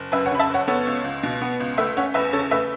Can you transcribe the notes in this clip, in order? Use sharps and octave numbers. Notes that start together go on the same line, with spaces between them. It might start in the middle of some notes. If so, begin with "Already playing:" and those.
Already playing: F#1
F#2 B4 E5
C#5 F#5
C#3 B5
E5 A5
F#1 C#5 F#5
B3 A4 C#5
C#2
C#2
B2
B3
C#2
A3 B4 E5
C#4 C#5 F#5
E2 B4 E5
C#3 A4 C#5
A3 B4 E5